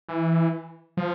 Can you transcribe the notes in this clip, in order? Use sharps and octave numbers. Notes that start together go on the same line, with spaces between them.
E3
F3